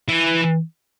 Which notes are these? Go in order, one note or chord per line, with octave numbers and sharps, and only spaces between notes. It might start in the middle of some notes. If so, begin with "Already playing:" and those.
E3